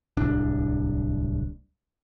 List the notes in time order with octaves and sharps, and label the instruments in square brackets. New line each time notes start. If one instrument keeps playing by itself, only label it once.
[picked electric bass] D1 C2 D4